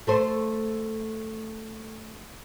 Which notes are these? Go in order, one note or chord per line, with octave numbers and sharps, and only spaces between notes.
A3 A4 C5